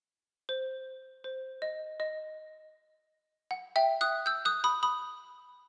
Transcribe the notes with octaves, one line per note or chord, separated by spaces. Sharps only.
C5
C5
D#5
D#5
F#5
E5 G5
D#6 F#6
E6 G6
D#6 F#6
B5 D#6
B5 D#6